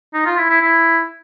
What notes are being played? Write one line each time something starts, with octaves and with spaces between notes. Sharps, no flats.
D#4
F4
E4
E4
E4